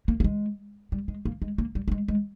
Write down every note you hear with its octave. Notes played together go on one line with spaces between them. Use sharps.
A#3
A#3
G#3
G3
G#3
A#3
G#3
A#3
G3
A#3
G#3
G#3